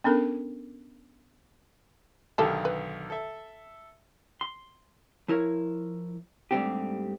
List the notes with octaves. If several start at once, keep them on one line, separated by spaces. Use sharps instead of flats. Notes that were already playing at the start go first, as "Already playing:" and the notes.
B3 C#4 D4 A4 A#4
B1 D3 D#3 G4 A4 A5
B4
A4 E5
C6
F3 E4 A#4 C#5
G#2 G3 A3 C4 D4 G4